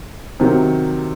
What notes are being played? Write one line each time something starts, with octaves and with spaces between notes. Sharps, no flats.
C3 D#3 F#3